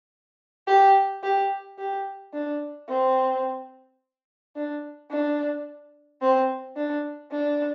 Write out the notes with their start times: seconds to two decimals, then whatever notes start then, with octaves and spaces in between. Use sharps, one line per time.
0.67 G4
1.24 G4
1.79 G4
2.34 D4
2.89 C4
4.56 D4
5.11 D4
6.22 C4
6.76 D4
7.32 D4